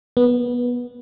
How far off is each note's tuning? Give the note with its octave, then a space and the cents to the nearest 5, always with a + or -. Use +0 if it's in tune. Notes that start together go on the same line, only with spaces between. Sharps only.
B3 -15